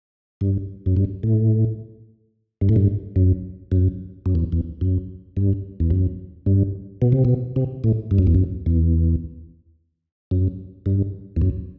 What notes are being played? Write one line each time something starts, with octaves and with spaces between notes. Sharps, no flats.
G2
F#2
G2
A2
G2
A2
G2
F#2
F#2
F#2
E2
E2
F#2
G2
E2
F#2
G2
B2
C3
B2
C3
A2
G2
F#2
E2
F#2
E2
F#2
G2
E2
F#2